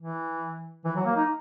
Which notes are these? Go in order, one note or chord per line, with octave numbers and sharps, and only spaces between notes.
E3
E3
F#3
A#3
D#4